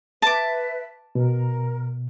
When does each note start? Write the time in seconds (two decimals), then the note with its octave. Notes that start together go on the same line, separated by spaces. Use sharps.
0.22 B4 E5 A5 D6
1.15 B2 A#4